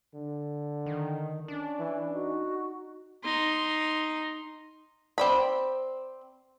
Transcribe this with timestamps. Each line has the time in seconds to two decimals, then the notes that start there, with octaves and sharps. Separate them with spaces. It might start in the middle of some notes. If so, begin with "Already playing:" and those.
0.14 D3
0.86 D#3
1.48 C#4 D4
1.79 E3
2.14 D#4 F#4
3.24 D#4 C6
5.18 C4 D5 B5